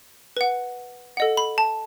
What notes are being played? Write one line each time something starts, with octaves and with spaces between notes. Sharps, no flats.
B4 F#5
A4 D#5 F#5
B5
A5